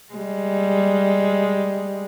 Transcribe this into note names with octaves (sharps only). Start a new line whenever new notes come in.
G3 G#3